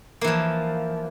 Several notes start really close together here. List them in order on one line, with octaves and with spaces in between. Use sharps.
A#3 E3 F3